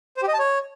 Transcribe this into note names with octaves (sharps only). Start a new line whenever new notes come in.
C5
G4
D#5
A5
C#5